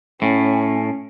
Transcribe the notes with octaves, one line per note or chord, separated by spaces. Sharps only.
A2 C#4